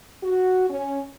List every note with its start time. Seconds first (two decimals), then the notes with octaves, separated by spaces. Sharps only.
0.23 F#4
0.70 C#4